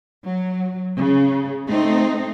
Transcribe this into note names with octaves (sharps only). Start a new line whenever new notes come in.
F#3
C#3
A3 C4 D#4